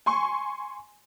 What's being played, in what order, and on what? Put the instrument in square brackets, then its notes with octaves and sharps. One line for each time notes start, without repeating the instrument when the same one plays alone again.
[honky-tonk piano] G#5 C6 C#6